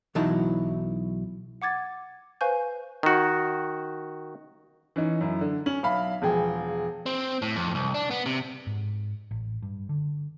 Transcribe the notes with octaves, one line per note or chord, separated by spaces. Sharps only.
B1 E3 F#3 D#4 E4 A5
F#5 D6 G#6 A6
B4 C5 F5 G#5 C#6 G6
D#3 F#4
E3 C#4 D#4
F#2 E4
D3
C#4 F#7
B1 E5 F5 B5
E1 F3 G#4 G5
C4
A2
F2
C2
D4
B3
C3
G#2
A1
G2
D3